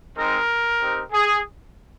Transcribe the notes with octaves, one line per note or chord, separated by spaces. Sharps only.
G#3 C4 D#4 A#4
C4 D#4 G4
G#4